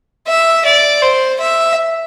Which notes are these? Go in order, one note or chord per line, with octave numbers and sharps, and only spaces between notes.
E5
D5
C5
E5